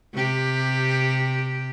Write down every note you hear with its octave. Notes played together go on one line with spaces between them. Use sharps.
C3 G4